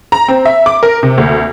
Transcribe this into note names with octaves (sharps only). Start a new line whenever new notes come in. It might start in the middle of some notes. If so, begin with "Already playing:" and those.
A#5
C4
E5
D6
A#4
C3
D2